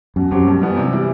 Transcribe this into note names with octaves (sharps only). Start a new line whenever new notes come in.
F#2 B2
F#2 F#3 C4 G4
G2
E3 G3 B3
C3
E3 G3